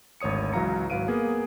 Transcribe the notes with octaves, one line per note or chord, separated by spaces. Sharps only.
G#1 D2 C#5 D#6 C#7
C#2 E3 F#3 F5 A#5 C#7
G#1 F#3 B4 F5 D7 D#7
A#3 B3 G#4 G#5